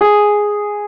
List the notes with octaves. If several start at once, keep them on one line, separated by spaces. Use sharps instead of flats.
G#4